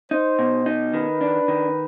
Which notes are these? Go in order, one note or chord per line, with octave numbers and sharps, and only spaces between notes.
D#4 C5
B2
D#4
D#3 B4
D4
D#3